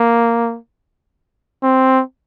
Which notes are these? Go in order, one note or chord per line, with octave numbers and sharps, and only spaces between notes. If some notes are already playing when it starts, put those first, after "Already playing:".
Already playing: A#3
C4